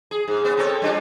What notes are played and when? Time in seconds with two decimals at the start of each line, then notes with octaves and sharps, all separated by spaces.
0.11 G#4
0.28 G#2
0.45 B3 C#4
0.57 C4 A4 C#5
0.82 G3 D4 F4